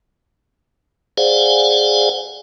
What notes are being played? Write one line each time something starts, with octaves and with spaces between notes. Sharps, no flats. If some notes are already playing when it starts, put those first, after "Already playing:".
G#4 C5 D5 F5 F#5 G#5